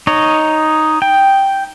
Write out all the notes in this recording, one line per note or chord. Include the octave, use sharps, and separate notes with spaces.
D#4 C#5
G5